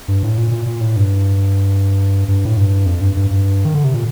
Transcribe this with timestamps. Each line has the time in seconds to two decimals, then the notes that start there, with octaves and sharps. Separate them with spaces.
0.08 G2
0.23 A2
0.38 A#2
0.51 A#2
0.66 A#2
0.81 A2
0.96 G2
2.28 G2
2.45 A2
2.57 G2
2.86 F2
3.01 G2
3.17 G2
3.31 G2
3.65 D#3
3.74 D3
3.84 C3
3.94 A#2